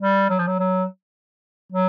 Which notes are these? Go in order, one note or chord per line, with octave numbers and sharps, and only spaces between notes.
G3
F#3
F3
F#3
F#3
F#3